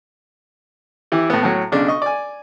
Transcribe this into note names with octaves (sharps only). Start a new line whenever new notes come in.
E3 E4 G4
A2 B3
A2 F#3
B1 C#3 D4
D#5 C#6
D5 G#5